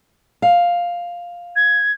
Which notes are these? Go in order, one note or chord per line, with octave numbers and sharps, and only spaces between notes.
F5
G#6